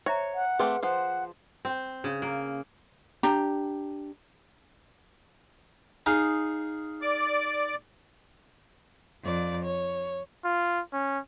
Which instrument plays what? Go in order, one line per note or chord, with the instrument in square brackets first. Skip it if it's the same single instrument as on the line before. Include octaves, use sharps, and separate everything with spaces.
[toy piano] C5 E5 A#5 [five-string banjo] C#5
[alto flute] F#5
[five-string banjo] A3 C4 G4 [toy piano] G#4 B4 C6
[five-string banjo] F3 C5 [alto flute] F#5
[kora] C4
C#3
A#3
[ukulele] D4 G4 G5 A#5
[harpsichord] D#4 G#4 F5
[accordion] D5 D6
[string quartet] F2 D5
C#5
[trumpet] F4
C#4